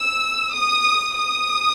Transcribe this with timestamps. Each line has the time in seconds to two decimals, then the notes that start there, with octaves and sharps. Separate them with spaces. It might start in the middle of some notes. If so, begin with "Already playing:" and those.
Already playing: E6
0.53 D#6
1.17 D#6